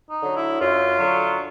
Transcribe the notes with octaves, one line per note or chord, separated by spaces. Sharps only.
D#4
D3 F#3
E4
F#2 F4
D3 F#3